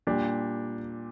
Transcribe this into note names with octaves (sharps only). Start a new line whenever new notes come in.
A#2 G3 D4 G4